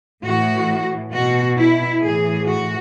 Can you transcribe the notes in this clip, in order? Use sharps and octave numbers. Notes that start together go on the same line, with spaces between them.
A2 E3 F#4
B2 F#4
E4
A2 E3 G#4
F#4